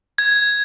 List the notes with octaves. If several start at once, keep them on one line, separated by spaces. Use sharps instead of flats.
G#6